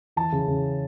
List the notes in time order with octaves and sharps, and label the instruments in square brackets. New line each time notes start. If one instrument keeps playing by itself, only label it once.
[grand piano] E3 A5
C#3
C#3